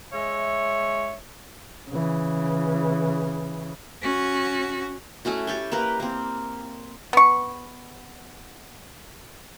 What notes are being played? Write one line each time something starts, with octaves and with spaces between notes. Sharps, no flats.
G#3 C#5 E5
C#3 E3
C#4 F#4
A3 C#4 E4 F#4
G4 A4 G5 G#5
A#3 G4 A#4 B4
A#3 C4
B3 C#6